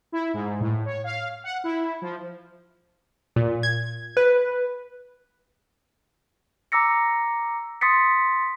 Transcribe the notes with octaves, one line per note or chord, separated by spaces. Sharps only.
E4
G#2
A2
C#5
F5
F#5
E4
F3
A#2
G#6
B4
A#5 D6 E6 A#6 C#7
C6 D#6 A6 B6 C#7